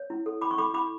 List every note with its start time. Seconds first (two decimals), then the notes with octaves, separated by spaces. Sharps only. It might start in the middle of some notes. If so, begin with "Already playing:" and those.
Already playing: C#5
0.10 E4
0.26 A4
0.41 E4 B5 D6
0.51 C#6
0.58 A4 B5 D6
0.74 E4 B5 D6